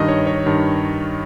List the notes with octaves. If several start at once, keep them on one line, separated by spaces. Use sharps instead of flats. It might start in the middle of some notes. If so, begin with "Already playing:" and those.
Already playing: G2 D#3 D#5
C#5
C#5
G2 D#3